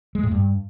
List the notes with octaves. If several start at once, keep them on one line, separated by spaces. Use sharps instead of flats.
G#3
A2
G2